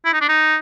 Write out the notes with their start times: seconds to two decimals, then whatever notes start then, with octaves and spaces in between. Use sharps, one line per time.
0.05 E4
0.13 D#4
0.21 D4
0.29 D#4